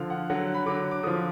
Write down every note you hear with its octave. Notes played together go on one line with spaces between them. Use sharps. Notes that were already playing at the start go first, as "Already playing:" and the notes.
Already playing: D3 F3 F5
F#5
D3 F#3 F#5
B5
D3 F#3 D6
D6
D3 F3 D#6